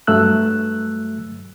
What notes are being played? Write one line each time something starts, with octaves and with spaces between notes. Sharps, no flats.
G2 F#3 A3 E6 F#6